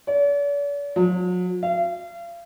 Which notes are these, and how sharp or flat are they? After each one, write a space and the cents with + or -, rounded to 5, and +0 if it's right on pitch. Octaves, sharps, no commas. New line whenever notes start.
D5 -45
F#3 -45
F5 -35